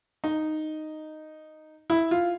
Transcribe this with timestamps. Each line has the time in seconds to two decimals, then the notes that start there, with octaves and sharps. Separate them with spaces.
0.24 D#4
1.90 E4
2.11 F4